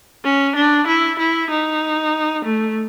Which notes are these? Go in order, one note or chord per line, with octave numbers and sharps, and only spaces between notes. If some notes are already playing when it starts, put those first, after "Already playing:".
C#4
D4
E4
E4
D#4
A3